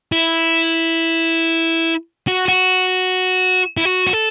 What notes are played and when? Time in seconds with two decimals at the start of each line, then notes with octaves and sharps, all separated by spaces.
0.12 E4
2.28 F#4
2.48 F#4
3.77 E4
3.85 F#4
4.07 F#4
4.13 A4